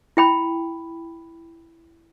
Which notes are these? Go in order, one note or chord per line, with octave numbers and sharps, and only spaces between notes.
E4 G5 B5